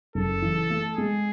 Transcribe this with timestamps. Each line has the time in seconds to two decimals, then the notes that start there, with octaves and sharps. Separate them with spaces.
0.15 F#1 A4
0.42 E3
0.70 A3
0.97 G#3 G#4